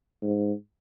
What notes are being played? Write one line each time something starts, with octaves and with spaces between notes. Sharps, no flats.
G#2